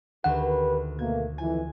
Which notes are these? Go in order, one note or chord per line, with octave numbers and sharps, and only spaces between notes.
D2 D#3 G4 A#4 B4 F#5 E7
B2 A3 A#3 G#6
F2 E3 G#5